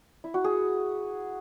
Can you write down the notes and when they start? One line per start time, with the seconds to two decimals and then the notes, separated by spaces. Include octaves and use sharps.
0.24 E4
0.34 F#4
0.44 G#4